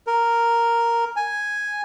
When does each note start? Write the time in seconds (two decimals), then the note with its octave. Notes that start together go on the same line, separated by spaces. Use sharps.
0.07 A#4
1.16 G#5